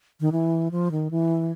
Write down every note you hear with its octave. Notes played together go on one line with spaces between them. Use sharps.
D#3
E3
F3
D#3
E3